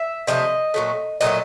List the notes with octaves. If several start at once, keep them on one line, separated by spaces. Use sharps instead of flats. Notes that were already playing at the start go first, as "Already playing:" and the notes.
Already playing: E5
C3 F3 A3 D#5
A#2 F#3 A3
A#2 F#3 A3 D#5